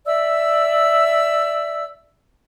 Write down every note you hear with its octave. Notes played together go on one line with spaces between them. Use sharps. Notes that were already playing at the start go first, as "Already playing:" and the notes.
D5 E5 E6